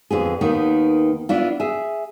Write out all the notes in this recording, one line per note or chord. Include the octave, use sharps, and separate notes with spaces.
F2 D3 B3 G#4
D#2 D#3 B3
B3 D4 E4 F4
G#4 E5